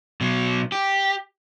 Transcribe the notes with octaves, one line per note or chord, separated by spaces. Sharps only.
B2 F#3
G4